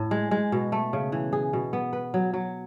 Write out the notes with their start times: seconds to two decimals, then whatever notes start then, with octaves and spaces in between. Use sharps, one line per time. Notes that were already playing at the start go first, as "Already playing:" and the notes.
Already playing: A2
0.11 G#3
0.31 G#3
0.52 B2
0.72 A3
0.93 C#3
1.12 E3
1.33 G#4
1.53 B2
1.73 B3
1.93 B4
2.14 F#3
2.34 F#3